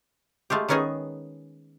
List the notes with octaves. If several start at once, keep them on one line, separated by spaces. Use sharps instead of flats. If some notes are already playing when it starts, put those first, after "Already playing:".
G#3 A3 F4 G4
D#3 B3 C#4 D#4 G#4